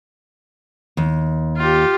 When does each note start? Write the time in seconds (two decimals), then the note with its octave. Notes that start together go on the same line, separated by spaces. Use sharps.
0.97 D#2
1.57 F4 G4